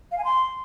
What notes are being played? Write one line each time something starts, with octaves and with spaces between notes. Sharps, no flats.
F5
G#5
C6